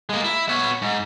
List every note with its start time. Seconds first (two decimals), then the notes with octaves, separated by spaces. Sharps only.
0.09 G#3 A#3
0.24 E4
0.49 B3 C#5
0.82 G#2